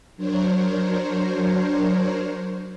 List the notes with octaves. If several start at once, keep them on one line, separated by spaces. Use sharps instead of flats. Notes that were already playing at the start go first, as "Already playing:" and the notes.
F#3 D4 A#4 C5 C#5